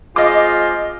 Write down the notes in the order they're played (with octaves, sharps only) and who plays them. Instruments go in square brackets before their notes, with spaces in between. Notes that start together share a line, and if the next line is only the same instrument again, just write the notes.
[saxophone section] G#3 C4 F4 [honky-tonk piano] D#5 D6